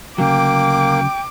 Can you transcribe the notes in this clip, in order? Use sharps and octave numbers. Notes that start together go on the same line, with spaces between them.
D2 C#3 F#3 A#3 G5 D6